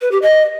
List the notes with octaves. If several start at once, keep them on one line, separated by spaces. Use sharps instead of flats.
B4
G4
D#5